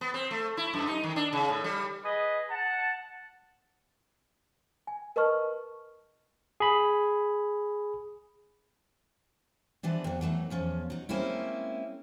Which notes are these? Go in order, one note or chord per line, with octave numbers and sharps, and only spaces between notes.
B3
C4
A3
E4
F#2
D#4
D#3
D4
C#3
A2
G3
G#4 B4 D#5
F#5 A5
G#5
A#4 B4 D#5 A5 C#6 F6
G#4 B5
E3 F3 B3 D4
F2 F#3
E3 F#3 A3 D#4
E2 F3 C#4
F#3 D#4
G#3 A#3 C4 C#4 E4